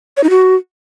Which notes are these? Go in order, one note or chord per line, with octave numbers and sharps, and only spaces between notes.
C#5
D#4
F#4